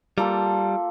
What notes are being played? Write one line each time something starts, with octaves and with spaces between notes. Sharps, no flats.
G3 A#3 F4 A4